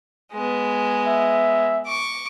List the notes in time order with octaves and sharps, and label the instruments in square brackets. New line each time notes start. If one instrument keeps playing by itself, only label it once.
[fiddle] G#3 B3
[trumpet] E5
[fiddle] C#6 D6